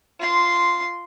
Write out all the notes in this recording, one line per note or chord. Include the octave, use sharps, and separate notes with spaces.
F4 C6